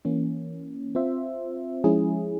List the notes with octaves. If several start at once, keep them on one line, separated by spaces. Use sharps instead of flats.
E3 A#3 C#4
C4 F4 C5 E5
F3 G#3 C#4 E4 G#4